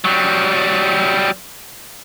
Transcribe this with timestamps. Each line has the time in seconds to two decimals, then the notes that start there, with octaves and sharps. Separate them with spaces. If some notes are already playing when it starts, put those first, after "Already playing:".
0.05 F#3 G3